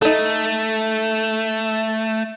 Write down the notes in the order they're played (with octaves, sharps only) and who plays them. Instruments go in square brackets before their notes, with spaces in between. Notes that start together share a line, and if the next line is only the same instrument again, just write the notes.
[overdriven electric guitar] A3 [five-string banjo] D#4 A4